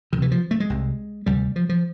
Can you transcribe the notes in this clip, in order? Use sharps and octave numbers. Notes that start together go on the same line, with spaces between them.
D2 C3 D#3 E3
F3
A3
G#3
C2 C3
D2 C3 G3
F3
F3